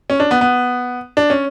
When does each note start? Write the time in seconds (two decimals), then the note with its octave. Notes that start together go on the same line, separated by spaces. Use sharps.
0.10 C#4
0.20 D4
0.31 B3
0.41 B3
1.17 D4
1.30 C#4